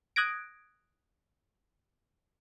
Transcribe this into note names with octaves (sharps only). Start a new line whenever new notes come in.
D#6 F#6 G#6 A#6 D7